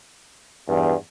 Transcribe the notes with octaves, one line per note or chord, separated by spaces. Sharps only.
E2 G2